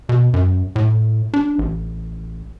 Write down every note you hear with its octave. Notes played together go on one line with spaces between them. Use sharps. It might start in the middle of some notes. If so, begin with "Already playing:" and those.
B2
F#2
A2
D4
A1